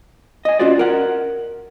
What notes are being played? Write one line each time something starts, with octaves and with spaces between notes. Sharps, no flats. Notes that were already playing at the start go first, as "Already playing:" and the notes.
D#5 G#5
C#4 F4 F#4 C5 D5
A#4 F#5